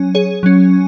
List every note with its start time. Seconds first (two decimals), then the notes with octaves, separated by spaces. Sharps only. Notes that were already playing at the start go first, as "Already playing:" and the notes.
Already playing: F#3 C#4
0.15 G#4 C#5
0.43 F#3 C#4